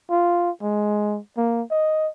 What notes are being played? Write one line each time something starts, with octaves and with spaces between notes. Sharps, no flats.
F4
G#3
A#3
D#5